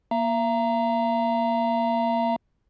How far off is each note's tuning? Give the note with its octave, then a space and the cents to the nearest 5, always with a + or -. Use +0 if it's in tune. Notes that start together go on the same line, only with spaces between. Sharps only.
A#3 +20 E5 +45 A#5 +0